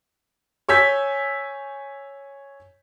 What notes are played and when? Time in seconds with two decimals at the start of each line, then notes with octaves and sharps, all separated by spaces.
0.69 C#5 G#5 E6 G6 B6